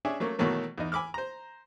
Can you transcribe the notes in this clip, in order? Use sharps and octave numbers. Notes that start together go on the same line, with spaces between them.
C#4 D4 G#4 E5 G#5
F#3 A3 A#3 C#4
B2 D#3 E3 F#3 A3 A#3
E2 D#4
G#5 B5 D6 E6 F6
C5 A#5